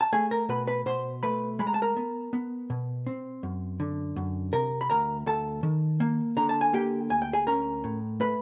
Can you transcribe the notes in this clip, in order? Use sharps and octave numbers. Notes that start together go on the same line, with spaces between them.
A5
A3 G#4 G#5
A#4 A#5
B2 B4 B5
B4 B5
B2 C5 C6
A3 B4 B5
G#3 B5
A#5
A5
A#4 A#5
B3
B3
B2
C4
F#2
D3
F#2
C3 A#4 A#5
B5
D2 A#4 A#5
D2 A4 A5
D#3
A#3
D3 A#5
A5
G#5
A#3 G4 G5
D2 G#5
G5
G#4 G#5
C#4 A#4 A#5
A2
A3 B4 B5